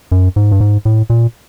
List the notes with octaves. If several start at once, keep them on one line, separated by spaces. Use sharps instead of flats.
F#2
G#2
G2
G#2
A2
A#2